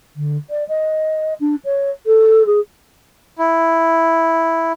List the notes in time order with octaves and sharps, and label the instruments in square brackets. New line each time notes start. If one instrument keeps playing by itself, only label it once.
[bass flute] D3
D5
D#5
D4
C#5
A4
G#4
[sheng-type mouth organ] E4